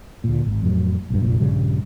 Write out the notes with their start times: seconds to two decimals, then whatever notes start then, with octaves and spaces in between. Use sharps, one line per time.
0.24 D2 A#2
0.46 G#1
0.62 F2 A2 F#3
1.10 B1 G2
1.22 F1 A#1 A#2
1.40 A#1 G2 C#3 G3